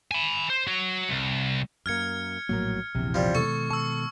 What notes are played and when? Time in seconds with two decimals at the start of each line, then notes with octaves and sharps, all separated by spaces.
0.11 G#5 B5
0.50 C5
0.67 F#4 C#5
1.09 C2
1.86 F#2 A#3 F6 G#6 C#7
2.49 A#1 A2 F#3 A#3 A#4
2.95 A#1 E2 C3
3.14 F3 G3
3.35 B2 D#3 G#3 A4 C#6
3.71 A5 C#6 E6